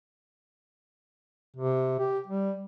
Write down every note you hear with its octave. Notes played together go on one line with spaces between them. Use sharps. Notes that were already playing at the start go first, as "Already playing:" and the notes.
C3
G4
G3